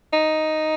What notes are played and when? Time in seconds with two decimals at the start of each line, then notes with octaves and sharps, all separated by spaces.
0.13 D#4